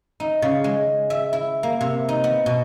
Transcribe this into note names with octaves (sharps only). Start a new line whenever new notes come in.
D#4
C#3
G#3
E5
E4
A#3
C3
D#4
B3
B2